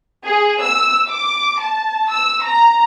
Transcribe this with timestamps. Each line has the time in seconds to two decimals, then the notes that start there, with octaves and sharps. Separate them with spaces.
0.24 G#4
0.61 E6
1.10 D6
1.60 A5
2.11 E6
2.44 A#5